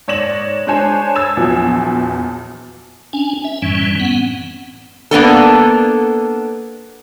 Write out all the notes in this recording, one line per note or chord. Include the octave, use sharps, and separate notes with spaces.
G#2 C#5 D5 A#6 E7 F#7
G#3 D4 C5 C#5 G#5 E7
E6 G#6 A6 E7
A#1 E2 F3 F#3
C#4 D4 G#5
E5
F#2 A2 E3 G3 C#4
B3 C4 F#5
A#3 B3 D4 A4